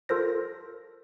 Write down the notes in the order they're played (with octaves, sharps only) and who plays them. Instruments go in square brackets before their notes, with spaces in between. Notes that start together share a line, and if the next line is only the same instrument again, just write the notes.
[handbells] F4 A4 A#4 C5 A#6